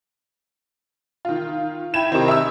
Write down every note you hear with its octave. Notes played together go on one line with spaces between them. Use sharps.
D#3 F4
E4 G5 G#6 E7
C3 D#3 C4
E5 E6